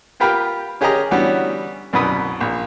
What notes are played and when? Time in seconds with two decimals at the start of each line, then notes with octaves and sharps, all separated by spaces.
0.20 F4 G4 A#4 B4 F5 G5
0.81 C#4 G4 G#4 A#4 D#5 A#5
1.11 D3 E3 G3 B3 C#4 F#4
1.93 C2 F#2 B2 B4 D#6
2.41 A#1